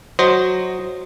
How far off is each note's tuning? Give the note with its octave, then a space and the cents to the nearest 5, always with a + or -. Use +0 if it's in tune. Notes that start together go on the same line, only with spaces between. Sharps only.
F#3 +0 C5 +0 D#5 +0